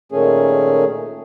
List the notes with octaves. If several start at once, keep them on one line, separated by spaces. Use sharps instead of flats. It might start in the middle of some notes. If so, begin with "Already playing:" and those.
A#2 D#3 A3 C#4 G#4